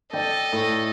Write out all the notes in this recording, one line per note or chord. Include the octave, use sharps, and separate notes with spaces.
A4 D5 D#5 G5
A2